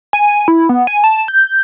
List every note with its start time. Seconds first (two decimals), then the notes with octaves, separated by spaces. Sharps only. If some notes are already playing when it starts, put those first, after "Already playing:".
0.13 G#5
0.48 E4
0.69 B3
0.87 G#5
1.04 A5
1.28 G6